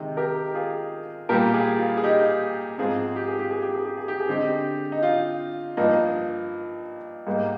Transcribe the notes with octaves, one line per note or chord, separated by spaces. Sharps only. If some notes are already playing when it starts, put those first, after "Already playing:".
Already playing: C3 D#3 G#3
G4 A#4
F4 G#4
A#2 G3 A#3 G4 A#4
F4 G#4
F4
G#4
D#4 G4
G#2 F3 C4 F4 G#4
G4
G#4
G4
G#4
G4
G#4
G4
G#4
G4
G#4
D3 G#3 C4 D#4 G4
D#4
F4
G2 F3 A#3 D#4
G#2 G3 A#3 D#4